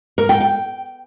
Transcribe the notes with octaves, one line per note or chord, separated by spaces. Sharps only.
A#4
G5
G5